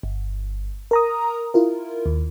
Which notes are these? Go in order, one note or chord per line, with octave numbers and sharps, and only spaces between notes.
G1
A#4 A#5 D#6
E4 F4 A#4
D#2